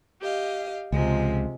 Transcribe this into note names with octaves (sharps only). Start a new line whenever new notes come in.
G4 D#5 F5
C#2 C3 F3 G#3